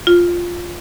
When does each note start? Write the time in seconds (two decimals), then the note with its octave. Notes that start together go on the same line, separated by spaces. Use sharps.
0.07 F4